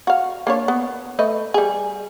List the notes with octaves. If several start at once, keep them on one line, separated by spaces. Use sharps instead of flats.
F#4 F5
A#3 D4 C#5
B3
A3 B4 D#5
G3 G#4